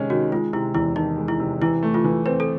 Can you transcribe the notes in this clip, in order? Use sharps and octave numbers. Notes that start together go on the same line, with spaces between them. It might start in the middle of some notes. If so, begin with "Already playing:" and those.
Already playing: C3 D#3 G#3 C#4
D#3 F#4
G#3 F4
C3 E4
E2 E4
D#3 D#4
G#3
E4
C3
E3 E4
A3
F4
E3
C4 B4
A4